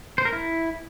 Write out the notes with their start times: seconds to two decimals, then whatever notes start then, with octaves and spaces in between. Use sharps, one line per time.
0.18 C5
0.25 A#4
0.33 E4